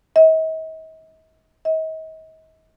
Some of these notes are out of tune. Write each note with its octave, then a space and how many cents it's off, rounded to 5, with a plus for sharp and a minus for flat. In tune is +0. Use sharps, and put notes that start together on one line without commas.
D#5 +45
D#5 +40